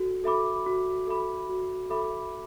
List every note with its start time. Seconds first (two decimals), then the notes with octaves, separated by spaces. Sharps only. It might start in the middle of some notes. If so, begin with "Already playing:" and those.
Already playing: F#4 A4
0.24 A4 E5 B5 D6
0.66 F#4
1.07 A4 E5 B5 D6
1.49 F#4
1.90 A4 E5 B5 D6